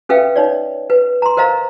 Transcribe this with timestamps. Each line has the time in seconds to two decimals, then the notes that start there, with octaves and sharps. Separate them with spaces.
0.09 C#4 A4 B4 E5 F5 G5
0.36 D#4 C#5 D5
0.90 B4
1.22 A#5 C6
1.37 A#4 C5 D#5 F5 A#5